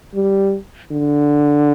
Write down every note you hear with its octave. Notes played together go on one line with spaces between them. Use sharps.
G3
D3